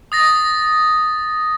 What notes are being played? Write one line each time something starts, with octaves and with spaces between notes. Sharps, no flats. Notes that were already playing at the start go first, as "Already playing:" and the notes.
D#6 A6 A#6